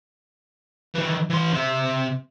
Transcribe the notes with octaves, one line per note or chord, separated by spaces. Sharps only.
D#3 E3
E3 C6
C3 E5